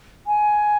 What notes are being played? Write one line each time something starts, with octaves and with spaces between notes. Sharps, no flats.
G#5